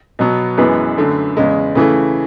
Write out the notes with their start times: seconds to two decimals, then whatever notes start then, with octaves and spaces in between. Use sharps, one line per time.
0.19 B2 F#3 B3
0.58 F#2 E3 G#3 B3 B4
0.97 F#2 D3 A3
1.37 E2 C#3 G#3
1.75 C#3 E3 A3